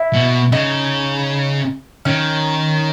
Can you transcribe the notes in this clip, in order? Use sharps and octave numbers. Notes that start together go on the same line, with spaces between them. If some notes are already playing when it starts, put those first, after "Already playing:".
Already playing: E4
B2
C#3 D#4
D#3 C#4